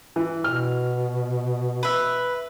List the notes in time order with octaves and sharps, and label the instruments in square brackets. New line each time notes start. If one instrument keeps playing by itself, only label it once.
[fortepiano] E3
[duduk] B2 [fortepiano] F6
[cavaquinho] B4 E5